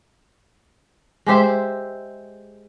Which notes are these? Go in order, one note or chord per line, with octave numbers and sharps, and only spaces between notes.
G#3 G4 C5 E5